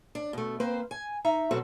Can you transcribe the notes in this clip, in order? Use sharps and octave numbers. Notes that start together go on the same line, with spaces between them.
D4
B2 A3
A#3 C4 B4 C5
G#5
D#4 E5 A#5
B2 F#3 C4 F#4 A4